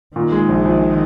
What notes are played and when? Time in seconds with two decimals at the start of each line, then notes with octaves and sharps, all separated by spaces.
0.16 A#2 D#3
0.32 G#3
0.48 A#1
0.65 A#1